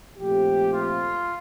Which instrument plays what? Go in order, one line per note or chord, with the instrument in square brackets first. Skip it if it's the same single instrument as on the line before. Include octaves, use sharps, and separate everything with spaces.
[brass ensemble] A#2 F3 A3 C4 G4
F4